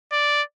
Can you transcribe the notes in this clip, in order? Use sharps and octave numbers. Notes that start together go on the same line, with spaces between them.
D5